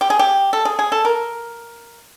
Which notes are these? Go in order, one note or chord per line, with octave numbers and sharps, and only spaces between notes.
G4
G#4
G4
A4
G#4
G#4
A4
A#4